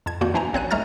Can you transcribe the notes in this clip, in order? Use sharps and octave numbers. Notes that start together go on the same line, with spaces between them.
F2 A5 G#6
F2 D#3 A#3 F#4 D5 G6
E3 D4 E4 C5 G#5 A#5
A#1 C4 C#5 F#6 D#7
B1 G#3 A3 A#5 F6 A6